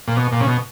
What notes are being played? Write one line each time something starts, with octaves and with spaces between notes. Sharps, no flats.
A#2
B2
A#2
C#3
B2